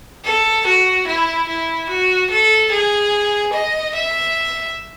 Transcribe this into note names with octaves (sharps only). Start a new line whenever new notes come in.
A4
F#4
E4
E4
F#4
A4
G#4
D#5
E5